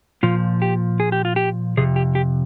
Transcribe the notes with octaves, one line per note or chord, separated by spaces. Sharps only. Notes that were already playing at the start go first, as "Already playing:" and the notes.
A#2 F3 F4
G4
G#4
G4
F4
G4
F2 C3 G#4
G4
G4